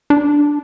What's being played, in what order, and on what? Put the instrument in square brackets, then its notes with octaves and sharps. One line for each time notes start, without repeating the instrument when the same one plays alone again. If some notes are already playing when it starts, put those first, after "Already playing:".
[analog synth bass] D4